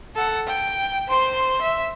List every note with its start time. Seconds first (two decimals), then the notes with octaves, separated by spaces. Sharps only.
0.15 A4 F#5
0.47 G5
1.08 C5 C6
1.62 E5